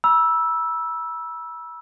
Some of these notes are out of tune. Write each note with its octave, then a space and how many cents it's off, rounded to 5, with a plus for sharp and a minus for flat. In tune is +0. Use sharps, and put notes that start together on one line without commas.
B5 -40 E6 +0